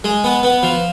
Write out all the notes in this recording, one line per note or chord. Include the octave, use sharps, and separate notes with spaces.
G#3
B3
B3
F3